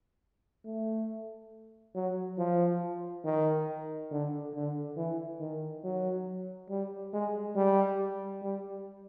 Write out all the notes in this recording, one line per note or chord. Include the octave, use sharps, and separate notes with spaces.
A3
F#3
F3
D#3
D3
D3
E3
D#3
F#3
G3
G#3
G3
G3